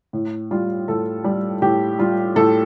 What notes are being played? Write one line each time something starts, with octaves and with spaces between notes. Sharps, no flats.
A2
G3 F4
A2 A4
G3
A2 G4
G3 F4
A2 A4